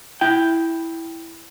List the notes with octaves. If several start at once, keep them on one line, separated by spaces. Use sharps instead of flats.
E4 G5